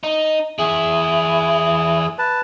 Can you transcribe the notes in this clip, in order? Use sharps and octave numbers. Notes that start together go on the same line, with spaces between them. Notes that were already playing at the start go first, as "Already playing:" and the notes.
D#4
E2 E4 G#4
B4 A5